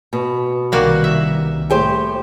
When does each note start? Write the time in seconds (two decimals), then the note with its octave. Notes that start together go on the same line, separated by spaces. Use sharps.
0.13 B2
0.72 C2 D#3 G3 A#3 F#4
1.04 E5
1.70 A2 G4 C5